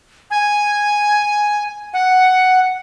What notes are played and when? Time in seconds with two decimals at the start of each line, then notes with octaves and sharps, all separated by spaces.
0.31 G#5
1.93 F#5